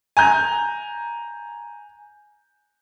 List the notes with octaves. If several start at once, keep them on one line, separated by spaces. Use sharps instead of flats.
G#5 A#5 G6